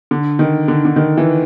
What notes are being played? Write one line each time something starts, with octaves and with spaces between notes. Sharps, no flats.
D3
D#3
D3
D3
D#3
E3